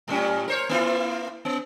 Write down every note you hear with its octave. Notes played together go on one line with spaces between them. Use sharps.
A2 G3 C#4
A#4 C5 C#5
A#3 E4 F4
B3